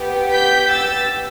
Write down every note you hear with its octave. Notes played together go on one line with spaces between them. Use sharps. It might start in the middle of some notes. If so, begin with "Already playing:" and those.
Already playing: B3 G4
G6 B6
E6 A6